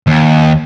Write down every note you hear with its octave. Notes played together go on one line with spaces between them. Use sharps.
D#2